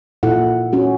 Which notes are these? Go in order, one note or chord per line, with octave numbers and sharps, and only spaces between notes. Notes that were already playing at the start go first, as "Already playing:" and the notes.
A#2 E4 A4 F#5
C#4 F#4 G4